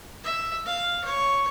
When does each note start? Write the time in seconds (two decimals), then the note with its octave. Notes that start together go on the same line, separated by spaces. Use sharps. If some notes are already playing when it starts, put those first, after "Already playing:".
0.24 E5
0.66 F5
1.04 C#5